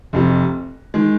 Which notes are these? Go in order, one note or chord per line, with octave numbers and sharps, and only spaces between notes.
F1 F2 C3
D#3 G#3